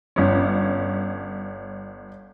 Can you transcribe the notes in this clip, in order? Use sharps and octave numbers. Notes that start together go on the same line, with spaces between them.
G1 C#4